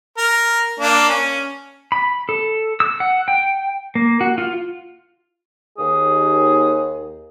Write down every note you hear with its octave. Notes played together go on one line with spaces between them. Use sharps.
A#4
A#3 D4
C#4
B5
A4
E6
F#5
G5
A#3
F#4
F4
D#2 G#4